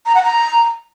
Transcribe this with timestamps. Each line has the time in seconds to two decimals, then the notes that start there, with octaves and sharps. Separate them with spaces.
0.06 A#5
0.15 F#5
0.24 A#5